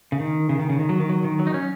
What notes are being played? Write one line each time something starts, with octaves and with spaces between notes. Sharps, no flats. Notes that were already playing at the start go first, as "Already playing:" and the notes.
C#3
D#3
C#3
D#3
C#3
D#3
F#3
D#3
F#3
D#3
F#3
D#4
C#4